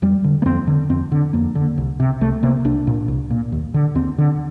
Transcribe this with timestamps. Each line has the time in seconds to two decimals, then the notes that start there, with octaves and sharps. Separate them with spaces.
0.02 F2 G3
0.24 D3
0.42 A#3
0.46 F2 C4
0.67 D3
0.90 F2 C4
1.12 D3
1.33 F2 A#3
1.55 D3
1.78 C2
2.00 C3
2.21 C2 A3
2.43 C3 A#3
2.65 C2 D4
2.87 A#2
3.08 C2
3.30 A#2
3.52 D#2
3.74 D3
3.95 D#2 C4
4.18 D3